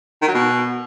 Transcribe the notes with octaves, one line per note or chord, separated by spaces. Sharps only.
D#3
F#3
B2